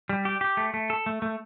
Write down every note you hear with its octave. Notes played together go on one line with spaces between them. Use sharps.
G3
G4
G4
A3
A3
A4
A3
A3